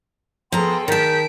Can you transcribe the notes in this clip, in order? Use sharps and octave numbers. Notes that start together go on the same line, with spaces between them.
F3 B3 G#4 A4 G5 A#5 C6
D#3 G#4 A#4 A5 G6 B6 D7